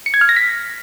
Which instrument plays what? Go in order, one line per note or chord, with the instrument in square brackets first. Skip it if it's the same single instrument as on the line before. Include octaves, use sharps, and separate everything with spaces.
[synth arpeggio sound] C#7
G#6
F6
A#6
B6